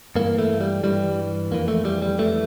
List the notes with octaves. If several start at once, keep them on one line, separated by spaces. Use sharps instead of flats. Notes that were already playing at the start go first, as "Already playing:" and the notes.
G2 E3 A#3
A3
G3
G2 E3 G3
F2 E3 A#3
A3
G3
G3
F2 E3 A3